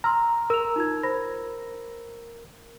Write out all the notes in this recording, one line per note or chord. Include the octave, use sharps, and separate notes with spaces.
A#5 C6 E6 F6
A#4 A#5 E6 F7
D#4 F4 G#6
C5 B5 A#6